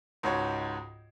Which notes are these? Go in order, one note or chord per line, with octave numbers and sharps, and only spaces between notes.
C#2 G#2 F#4 C#5